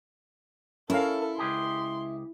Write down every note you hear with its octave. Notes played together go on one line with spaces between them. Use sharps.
C#4 E4 A4 A#4 F5
C#2 G4 G#4 C6